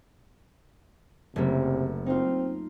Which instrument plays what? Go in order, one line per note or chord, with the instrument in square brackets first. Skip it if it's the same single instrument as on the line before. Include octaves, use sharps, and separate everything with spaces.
[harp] F#1 A3 A#3 [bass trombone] C3
[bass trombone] C4 [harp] D#4 F4